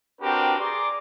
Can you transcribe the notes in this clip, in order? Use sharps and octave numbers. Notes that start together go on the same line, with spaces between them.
C4 D4 F#4 G4 A#4 B4
G#4 D5 A#5 C6 D6